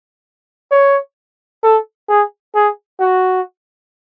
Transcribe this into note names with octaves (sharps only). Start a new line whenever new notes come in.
C#5
A4
G#4
G#4
F#4